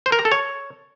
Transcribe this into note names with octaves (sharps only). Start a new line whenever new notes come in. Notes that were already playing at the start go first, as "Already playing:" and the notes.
C5
A#4
A#5
A4
C#5